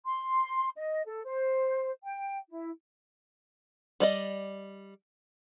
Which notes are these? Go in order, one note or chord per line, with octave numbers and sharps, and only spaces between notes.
C6
D#5
A4
C5
G5
E4
G3 D5 D#5